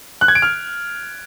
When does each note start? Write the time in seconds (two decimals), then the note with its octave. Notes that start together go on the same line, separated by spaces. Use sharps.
0.21 F#6
0.28 G#6
0.35 D7
0.42 F6